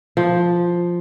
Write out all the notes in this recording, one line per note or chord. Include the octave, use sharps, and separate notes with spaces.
F3